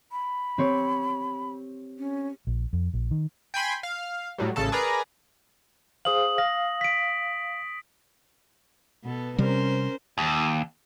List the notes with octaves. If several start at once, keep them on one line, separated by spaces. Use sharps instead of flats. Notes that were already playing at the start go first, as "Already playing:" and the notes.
B5
C4 G4 C#5
C#4
A#1
F2
A#1
D#3
G5 G#5 B5 C6
F5
A2 F#3 G3
A1 C#3 A4 A5
G#4 A#4 B4 D5 A#5
G#4 C5 F5 D#6 F#7
F5 A#6
B6 D7
B2 B3 A4
C3 G3 C#4 A#4 C5
D#2